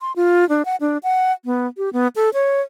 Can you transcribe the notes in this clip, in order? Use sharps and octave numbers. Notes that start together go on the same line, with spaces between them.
C6
F4
D4
F#5
D4
F#5
B3
G4
B3
A4
C#5